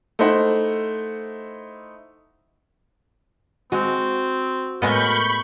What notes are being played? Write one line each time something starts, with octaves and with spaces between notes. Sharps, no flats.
A3 D#4 E4 C5 F#5
G#3 C4 F#4
A2 G#3 B3 A#4 B5 C#6 G6